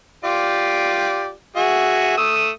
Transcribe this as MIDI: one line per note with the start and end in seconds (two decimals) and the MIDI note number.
0.24 1.32 65
0.24 1.32 67
0.24 1.32 74
1.56 2.15 66
1.56 2.15 68
1.56 2.15 76
2.17 2.49 57
2.17 2.49 87
2.17 2.49 88